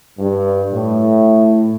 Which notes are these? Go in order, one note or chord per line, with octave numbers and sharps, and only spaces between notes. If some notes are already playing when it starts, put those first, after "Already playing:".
G2
A2